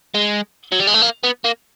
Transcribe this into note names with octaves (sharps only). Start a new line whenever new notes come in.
G#3
F#3
G3
G#3
A3
A#3
B3
A#3